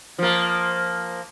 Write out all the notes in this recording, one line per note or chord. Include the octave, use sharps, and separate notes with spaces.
F3 A#3